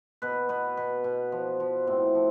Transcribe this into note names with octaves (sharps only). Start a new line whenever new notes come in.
B2 B4
B2 B4
B2 B4
B2
F3
F3
A2 C4
F3